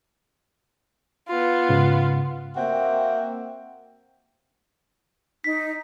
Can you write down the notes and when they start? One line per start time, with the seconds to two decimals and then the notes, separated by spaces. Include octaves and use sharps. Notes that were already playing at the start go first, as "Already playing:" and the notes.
1.28 B3 F4
1.69 G#2 C#3
2.56 A#3 C4 F#4 E5 G5
5.44 D#4 B6